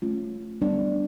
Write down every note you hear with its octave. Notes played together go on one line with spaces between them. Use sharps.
A3 C#4 F4
G3 B3 D4